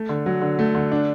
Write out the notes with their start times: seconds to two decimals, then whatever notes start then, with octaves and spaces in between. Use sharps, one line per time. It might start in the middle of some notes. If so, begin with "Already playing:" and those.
Already playing: A3
0.09 D3
0.26 F#3
0.41 D3
0.59 A3
0.75 D3
0.92 D4